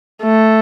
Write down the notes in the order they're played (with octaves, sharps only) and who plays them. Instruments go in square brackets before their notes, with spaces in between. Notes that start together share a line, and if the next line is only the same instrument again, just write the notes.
[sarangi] A3